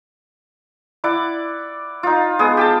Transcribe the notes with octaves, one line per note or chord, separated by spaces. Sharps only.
E4 D5 F#5 D6
D#4 F4
G#3 B3 G#4 D#6
G4 G5 A5